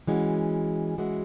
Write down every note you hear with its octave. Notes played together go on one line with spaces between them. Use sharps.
E3 G#3 C#4 F#4
E3 G#3 C#4 F#4